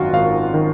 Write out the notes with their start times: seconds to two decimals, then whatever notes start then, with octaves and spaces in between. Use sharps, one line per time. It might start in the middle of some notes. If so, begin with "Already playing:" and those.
Already playing: G#1 F#2 D#3 F4 F#4
0.13 G#1 F5
0.54 D#3